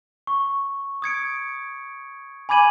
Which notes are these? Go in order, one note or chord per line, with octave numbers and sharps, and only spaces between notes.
C#6
D#6 G#6 C#7 D7
G#5 B5 D6 G#6 D#7 F#7